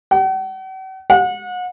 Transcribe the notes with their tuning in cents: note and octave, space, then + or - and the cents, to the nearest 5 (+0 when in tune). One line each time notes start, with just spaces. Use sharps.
F#5 +45
F#5 -35